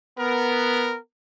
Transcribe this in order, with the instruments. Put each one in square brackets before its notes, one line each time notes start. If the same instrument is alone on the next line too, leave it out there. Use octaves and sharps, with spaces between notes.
[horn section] B3 A#4